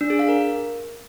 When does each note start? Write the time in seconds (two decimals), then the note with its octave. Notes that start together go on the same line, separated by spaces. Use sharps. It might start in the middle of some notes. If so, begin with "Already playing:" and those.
0.01 D4
0.10 G#4
0.19 F5
0.29 A#4